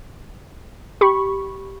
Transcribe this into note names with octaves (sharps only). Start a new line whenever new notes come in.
G4 B5 C#6